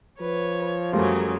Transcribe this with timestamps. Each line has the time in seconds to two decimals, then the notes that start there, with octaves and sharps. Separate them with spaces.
0.20 F3 B4 C#5
0.93 F#2 C#3 F#3 G3 A3 A#3 F4 G#4